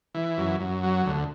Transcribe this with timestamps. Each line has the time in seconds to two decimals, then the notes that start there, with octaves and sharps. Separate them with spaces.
0.15 E3
0.38 F#2
0.60 F#2
0.83 F#3
1.06 D2